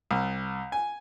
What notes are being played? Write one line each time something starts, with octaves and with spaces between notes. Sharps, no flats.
C2
G#5